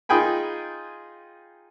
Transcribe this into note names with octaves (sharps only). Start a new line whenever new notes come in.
D#4 F4 G#4 G5 G#5 B5